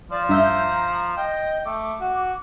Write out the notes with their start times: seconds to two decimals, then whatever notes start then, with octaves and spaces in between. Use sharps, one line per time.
0.11 F3 D5
0.29 G2 E5 A#5 G6
1.17 D#5 G5
1.65 A3 D6
2.00 F#4